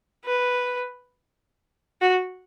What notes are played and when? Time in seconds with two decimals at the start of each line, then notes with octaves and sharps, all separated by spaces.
0.25 B4
2.01 F#4